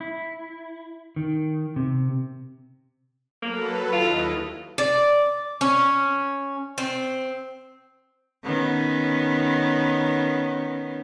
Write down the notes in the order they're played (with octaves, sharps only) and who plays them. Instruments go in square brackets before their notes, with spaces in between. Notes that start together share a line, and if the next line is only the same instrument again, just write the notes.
[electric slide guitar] E4
D#3
C3
[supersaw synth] F#3 A4 B4 [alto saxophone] A#3
[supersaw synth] D#2 E4 D#5 [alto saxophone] F4
[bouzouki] D5
C#4
C4
[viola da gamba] D#3 B3 C#4